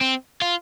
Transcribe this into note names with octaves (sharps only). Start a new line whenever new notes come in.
C4
F4